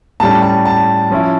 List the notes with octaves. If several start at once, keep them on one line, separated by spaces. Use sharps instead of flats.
A2 G3 C#4 A5
A5
A5
F3 C#4 E4